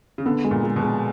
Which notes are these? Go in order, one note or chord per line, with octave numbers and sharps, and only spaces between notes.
C#3
D3 B3
G#3
A#2
G#3
B2
G#3